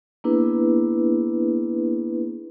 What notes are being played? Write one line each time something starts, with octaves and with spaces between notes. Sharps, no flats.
A#3 B3 D4 E4 G#4 B4